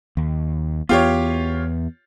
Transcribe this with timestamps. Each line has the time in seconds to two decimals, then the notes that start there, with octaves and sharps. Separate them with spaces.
0.17 D#2
0.89 E2 B3 F4 G4 C#5